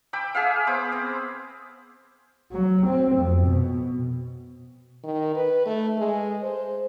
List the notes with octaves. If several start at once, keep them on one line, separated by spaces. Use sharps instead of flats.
G5 B5 D6 E6
G#4 E5 F5
B3 C5 B5 D6
C4
F#3
C4
F2
B2
D#3
B4
A3
G#3
C5